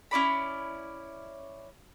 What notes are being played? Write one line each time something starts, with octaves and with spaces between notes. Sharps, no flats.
C#4 E4 D5 B5